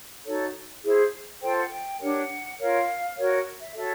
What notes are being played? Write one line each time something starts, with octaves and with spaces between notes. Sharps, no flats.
D#4 F#4 A4 C#5
E4 G#4 C5
F4 A4 C5 G5
F#5
G5
D4 G4 A#4 C#5 F#5
F4 A#4 C#5 F5
F#4 A#4 C#5
E5
F#4 A4 C#5 E5